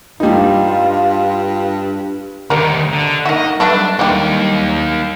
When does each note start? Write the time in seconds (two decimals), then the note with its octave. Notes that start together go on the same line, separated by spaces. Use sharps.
0.20 G2 G3 D#4 F4
2.50 D2 D#3 G3 A#4
2.93 D3
3.25 A#3 D#4 F#4 A#4 D#5 E5
3.60 F#3 G3 A3 D4 B4 E5
3.99 D3 E3 A#3 D#4 G4